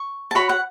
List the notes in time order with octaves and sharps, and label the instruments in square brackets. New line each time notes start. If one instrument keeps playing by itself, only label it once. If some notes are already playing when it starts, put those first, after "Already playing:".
Already playing: [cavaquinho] C#6
A5
F#4 C#5 B5
F#5